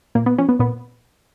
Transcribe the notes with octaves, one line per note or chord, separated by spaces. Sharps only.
A#2 A#3
B3
F3 C#4
B3
A#2 B3